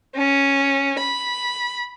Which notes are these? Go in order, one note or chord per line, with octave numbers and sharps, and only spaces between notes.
C#4
B5